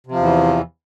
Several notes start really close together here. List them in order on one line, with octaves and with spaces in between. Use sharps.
C3 F3 E2 E3